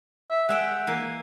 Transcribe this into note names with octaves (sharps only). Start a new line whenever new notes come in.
E5
G#3 E5 F#5 G5
E3 A#3